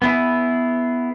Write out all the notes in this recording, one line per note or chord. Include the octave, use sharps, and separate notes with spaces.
B3 E4 G#4